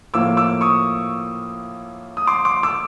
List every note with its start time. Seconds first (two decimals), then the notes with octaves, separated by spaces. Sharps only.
0.14 A2 F3 A#3 D6 E6
0.37 D6 E6
0.61 C#6 D#6
2.17 D#6
2.27 C6 D6
2.45 C6 D6
2.63 D6 E6